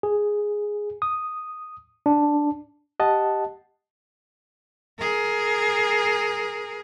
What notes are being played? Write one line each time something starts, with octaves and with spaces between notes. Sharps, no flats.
G#4
D#6
D4
G4 D#5 F#5 A5
G#4 A#4